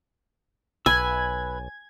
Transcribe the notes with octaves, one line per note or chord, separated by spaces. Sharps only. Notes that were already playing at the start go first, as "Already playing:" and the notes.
B1 B4 G#5 B5 E6 G#6